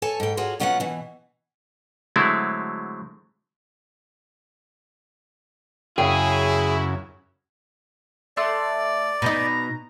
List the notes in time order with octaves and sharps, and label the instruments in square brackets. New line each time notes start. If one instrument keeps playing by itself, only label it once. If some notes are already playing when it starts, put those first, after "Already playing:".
[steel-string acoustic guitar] A4 C#5 G#5 A5
G#2 G5
F4 F#4 G#4 C#5
B2 F#3 C#4 F4 D5 F#5
B2 E3
[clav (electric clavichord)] D3 F#3 G#3 A3 C4 E4
[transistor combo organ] F#2 C#3 [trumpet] E4 [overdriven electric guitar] G#4 [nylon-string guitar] C#5 F5 G5
[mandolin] A3 C6 F#6 [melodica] D5
[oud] B2 D#4 [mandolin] B4 G6 [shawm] A#5